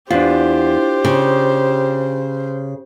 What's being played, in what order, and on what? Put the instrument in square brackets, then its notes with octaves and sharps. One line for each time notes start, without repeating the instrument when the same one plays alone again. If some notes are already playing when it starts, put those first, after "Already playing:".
[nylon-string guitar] E2 [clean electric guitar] D4 F4 [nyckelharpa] G4 [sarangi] C5
[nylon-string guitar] C#3